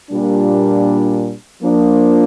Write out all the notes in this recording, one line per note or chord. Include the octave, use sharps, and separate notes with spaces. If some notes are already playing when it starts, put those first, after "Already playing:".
A#2 G3 D4
F3 A#3 D4